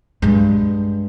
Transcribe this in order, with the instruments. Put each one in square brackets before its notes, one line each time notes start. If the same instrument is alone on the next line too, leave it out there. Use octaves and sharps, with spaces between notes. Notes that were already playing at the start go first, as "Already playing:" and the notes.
[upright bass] G2 G#3